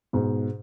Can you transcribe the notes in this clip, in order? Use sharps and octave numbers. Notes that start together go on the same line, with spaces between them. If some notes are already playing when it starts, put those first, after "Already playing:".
G#2 B2